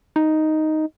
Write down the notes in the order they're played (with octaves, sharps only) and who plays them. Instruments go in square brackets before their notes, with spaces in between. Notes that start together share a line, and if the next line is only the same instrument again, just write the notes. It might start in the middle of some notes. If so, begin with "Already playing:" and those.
[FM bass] D#4